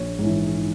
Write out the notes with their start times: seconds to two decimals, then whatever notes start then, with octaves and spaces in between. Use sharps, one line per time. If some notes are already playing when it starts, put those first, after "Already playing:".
Already playing: A#1 C#5
0.19 G#2 E3